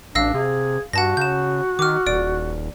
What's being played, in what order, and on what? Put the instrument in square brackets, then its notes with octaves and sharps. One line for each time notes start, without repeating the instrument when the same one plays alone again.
[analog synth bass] A1 [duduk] D4 [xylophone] F5 E6 A#6
[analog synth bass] C3 [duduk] G#4
[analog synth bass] G2 [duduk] F#4 [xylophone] F#5 A5 A#6
[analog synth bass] C#3 [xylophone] G6 E7
[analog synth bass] D#3 [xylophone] D6 F6
[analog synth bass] D#1 [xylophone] D5 D7